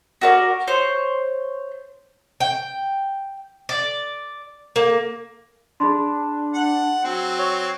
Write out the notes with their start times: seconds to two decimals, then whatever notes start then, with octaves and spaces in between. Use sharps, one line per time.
0.21 F#4 A#4 D5
0.68 C5 C#5
2.40 G5
3.69 D5
4.76 A#3
5.80 D4 G#4 B5 C6
6.54 F#5
7.04 F#3 C4
7.39 C#5